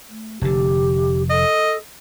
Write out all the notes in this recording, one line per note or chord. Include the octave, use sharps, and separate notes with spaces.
A3
F1 D3 G4
A4 D#5